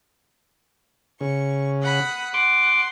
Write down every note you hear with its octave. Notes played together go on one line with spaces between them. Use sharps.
C#3 C#6
F#5 B5 D#6
F#5 C6 D6